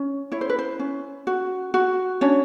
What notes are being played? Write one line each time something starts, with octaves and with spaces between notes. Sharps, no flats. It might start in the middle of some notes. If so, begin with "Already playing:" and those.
Already playing: C#4
E4 C#5
C5
B4
C5
C#4
F#4
F#4
C#4 D4 C#5